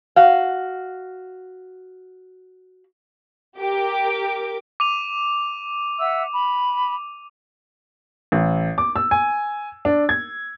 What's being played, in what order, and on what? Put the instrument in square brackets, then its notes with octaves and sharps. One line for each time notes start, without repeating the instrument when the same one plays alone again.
[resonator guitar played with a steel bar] F#4 F5
[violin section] G4 A#4 D6
[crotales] D6 D#7 F7
[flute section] E5 F#5 E6
B5
[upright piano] A1
D6
E6
G#5
D4
G#6